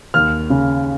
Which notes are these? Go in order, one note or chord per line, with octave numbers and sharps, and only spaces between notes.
D#2 F6
C#3